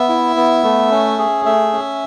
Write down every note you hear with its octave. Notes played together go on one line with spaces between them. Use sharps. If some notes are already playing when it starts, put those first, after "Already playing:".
Already playing: B3 E5
E4
B3
A3
C#4
G#4
A3 E5
C#4